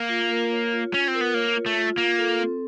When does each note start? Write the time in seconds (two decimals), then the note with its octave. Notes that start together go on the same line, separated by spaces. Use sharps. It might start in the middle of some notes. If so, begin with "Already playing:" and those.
Already playing: A#3
0.09 F4
0.29 A#4
0.51 C#5
0.72 F4
0.92 C#4 F4
1.08 C4
1.14 A#4
1.21 B3
1.34 A#3 C#5
1.56 F4
1.66 A3
1.77 F4
1.97 A#3 F4
2.18 A4
2.40 C4